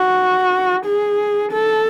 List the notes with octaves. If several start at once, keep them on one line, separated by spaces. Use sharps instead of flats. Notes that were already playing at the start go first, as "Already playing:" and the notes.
Already playing: F#4
G#4
A4